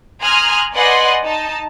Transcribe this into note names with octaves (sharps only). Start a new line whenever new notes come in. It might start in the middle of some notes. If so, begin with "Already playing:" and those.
G#5 A#5 C6 D#6 F6 F#6
B4 D5 D#5 F#5 G#5 C6
D#4 A5